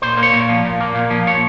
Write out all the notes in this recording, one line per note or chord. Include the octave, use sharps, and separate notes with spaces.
A#2 C5
A#3
C#5
A#2
F3
A#2
A#3
A#2
F3
A#2 C#5